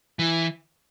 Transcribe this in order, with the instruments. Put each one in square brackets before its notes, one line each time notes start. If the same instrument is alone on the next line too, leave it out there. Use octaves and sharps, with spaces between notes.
[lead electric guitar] E3